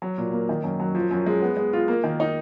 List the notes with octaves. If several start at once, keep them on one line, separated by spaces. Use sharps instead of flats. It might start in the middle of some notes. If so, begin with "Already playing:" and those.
F#3
A#2
A#3
D#3
F#2
F#3
F3
F#2
G#3
B3
G#3
F4
A#3
D#3
D#4